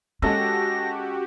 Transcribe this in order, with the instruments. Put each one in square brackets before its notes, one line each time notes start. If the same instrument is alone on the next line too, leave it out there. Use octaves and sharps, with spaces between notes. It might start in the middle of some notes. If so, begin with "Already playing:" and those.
[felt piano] G#3 A4 E6 [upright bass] C#4 [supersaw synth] F#4 G4 [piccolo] A#6